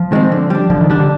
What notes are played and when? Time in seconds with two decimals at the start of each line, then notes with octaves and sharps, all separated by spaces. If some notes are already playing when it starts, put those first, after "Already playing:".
Already playing: F3
0.12 D#3 G#3 C4
0.32 D3
0.50 G3 D4
0.70 D3 F3
0.81 D#3
0.90 D3 G3 D4
1.00 D3